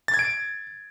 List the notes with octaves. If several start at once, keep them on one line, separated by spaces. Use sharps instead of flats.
A6
G#6
D7